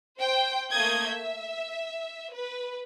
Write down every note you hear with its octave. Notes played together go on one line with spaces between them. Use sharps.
C5 G5
A3 A#3 D#6 G6 G#6
E5
B4